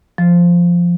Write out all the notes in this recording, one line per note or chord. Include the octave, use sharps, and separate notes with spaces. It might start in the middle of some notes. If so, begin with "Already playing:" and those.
F3